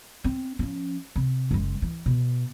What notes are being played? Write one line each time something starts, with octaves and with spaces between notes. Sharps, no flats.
C4
F3 C#4
C3
F#1 G#3
E3
B2